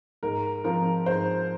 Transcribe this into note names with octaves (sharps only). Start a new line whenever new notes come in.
G#2 A#4
F3 C4 F4 A#4
G#2 C5